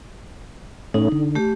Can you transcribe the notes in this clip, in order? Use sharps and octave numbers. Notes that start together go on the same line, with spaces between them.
A2 A3 C#4 D#4
D3
A3 G4